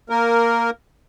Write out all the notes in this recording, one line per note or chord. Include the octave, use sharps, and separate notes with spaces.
A#3 A#4